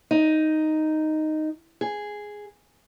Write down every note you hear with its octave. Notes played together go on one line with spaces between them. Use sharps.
D#4
G#4